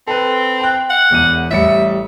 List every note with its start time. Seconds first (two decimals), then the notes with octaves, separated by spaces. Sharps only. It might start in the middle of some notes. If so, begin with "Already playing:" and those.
0.07 C4 A4 B4
0.61 G5 F#6
0.90 F#5
1.10 E1 E2 D#7
1.51 A1 G3 E5 C#7